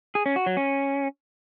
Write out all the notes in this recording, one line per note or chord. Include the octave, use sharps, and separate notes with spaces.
G#4
C#4
F#4
F#3
C#4